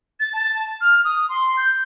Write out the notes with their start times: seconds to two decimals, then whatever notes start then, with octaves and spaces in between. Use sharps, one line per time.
0.20 A6
0.33 A5
0.81 F6
1.04 D#6
1.29 C6
1.57 G6